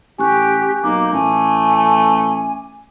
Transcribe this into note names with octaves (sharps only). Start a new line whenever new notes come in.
A1 G4 G#5 C#6 F#6
B1 A#3 D#4 D6
A1 A3 G#5